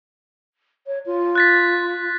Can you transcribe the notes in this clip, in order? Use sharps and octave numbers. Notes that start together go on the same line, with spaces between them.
C#5
F4
F#6 A6 B6